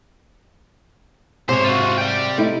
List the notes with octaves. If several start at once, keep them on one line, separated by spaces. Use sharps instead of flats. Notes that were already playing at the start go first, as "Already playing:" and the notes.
G#2 C3 C5 C#5
F4 F#4
D5 G5
A3 D#4 E4